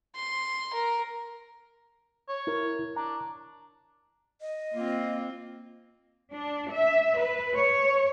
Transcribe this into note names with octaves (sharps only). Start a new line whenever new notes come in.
C6
A#4
C#5
E4 A#4
D4 A#5
D#5
A#3 C4 F4
D4
E5
B4
C#5